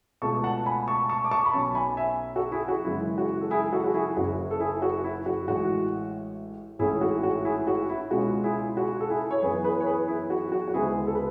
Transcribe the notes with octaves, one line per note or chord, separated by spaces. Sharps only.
C#2 B2 A3 A5 C#6
F#5 A5
G#5 B5
A5 C#6
A5 C#6
D6
A5 C#6
B5
B1 B2 F#3 C#4 A5 C#6
G#5 B5
E5 G#5
F#4 A4
E4 G#4
F#4
F#2 C#3 E3 G#3 E4
F#4
A4
E4 G#4
F#4 A4
F#4
E4 G#4
F#1 F#2 C#3 F#4
A4
E4 G#4
F#4
E4
F#4
A1 A2 G#3 F#4
A1 G#2 E3 A3 C#4 E4 G#4
G#4
F#4
F#4
E4 G#4
F#4
E4
C#2 B2 G#3 C#4 F#4
E4 G#4
F#4
A4
E4 G#4
C#5
F#2 E3 B3 G#4 B4
G#4 B4
C#5
G#4 B4
E4 G#4
F#4
F#4
F#4
D2 C#3 G#3 B3 E4 G#4
A4
B4